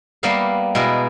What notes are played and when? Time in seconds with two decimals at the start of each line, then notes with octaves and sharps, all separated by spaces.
0.23 G3 A#3 B3 G4 E5 F5
0.75 B2 G#3 E4 A#4